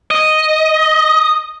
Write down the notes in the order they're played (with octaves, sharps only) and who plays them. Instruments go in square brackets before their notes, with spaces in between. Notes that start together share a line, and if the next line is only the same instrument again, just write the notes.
[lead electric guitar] D#5